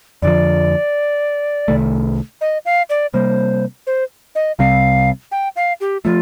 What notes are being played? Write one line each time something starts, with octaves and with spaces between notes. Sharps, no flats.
F2 D3 F3 D5
C2 C3 D#3 A3
D#5
F5
D5
C3 G3 A#3 C5
C5
D#5
C2 C3 G3 C4 F5
G5
F5
G4
F3 A3 F4